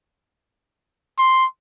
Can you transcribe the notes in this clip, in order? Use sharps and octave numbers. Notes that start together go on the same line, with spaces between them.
C6